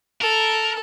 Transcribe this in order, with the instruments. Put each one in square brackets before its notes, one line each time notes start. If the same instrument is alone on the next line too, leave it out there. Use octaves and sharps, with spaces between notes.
[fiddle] A4 [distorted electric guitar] A#4